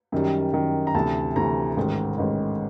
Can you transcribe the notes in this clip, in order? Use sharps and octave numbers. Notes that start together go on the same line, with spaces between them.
F#2 D#3 G3
F#2 D#3 G3
A#5
D2 C3 E3 A5
D2 C3 E3 A#5
A1 G#2 D#3
A1 G#2 D#3